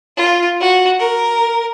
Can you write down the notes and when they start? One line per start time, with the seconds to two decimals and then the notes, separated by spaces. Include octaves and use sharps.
0.17 F4
0.61 F#4
0.99 A#4